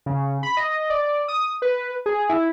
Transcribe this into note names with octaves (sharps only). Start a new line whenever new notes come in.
C#3
B5
D#5
D5
D#6
B4
G#4
E4